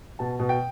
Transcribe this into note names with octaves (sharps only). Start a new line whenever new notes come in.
B2 A5
B2
G5